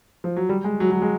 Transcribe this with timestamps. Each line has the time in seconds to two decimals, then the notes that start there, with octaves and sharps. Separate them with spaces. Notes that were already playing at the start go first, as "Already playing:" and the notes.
0.24 F3
0.36 F#3
0.49 G3
0.64 G#3
0.80 F#3
0.91 F#3
1.02 G#3